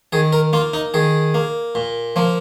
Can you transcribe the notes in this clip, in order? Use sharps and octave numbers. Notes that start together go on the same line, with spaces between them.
D#3 G#4
A#4
A#3 F4
D#4
D#3 G#4
A#3
A#2
F3 A#3